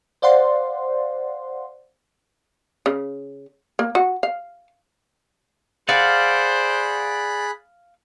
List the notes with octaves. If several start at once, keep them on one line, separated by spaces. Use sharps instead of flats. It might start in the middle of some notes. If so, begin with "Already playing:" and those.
C5 D5 F5 F#5 C6
C#3
A#3
F#4
F5
G#4 C5 D5 F5 F#5 B5 F#6